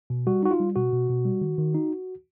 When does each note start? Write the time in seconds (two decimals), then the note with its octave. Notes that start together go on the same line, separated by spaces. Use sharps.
0.10 B2
0.27 G3 F#4
0.43 D#4 F#4
0.51 F4
0.60 G3
0.76 B2 F#4
0.93 B2
1.10 B2
1.25 G3
1.41 D#3
1.58 D#3
1.75 D#4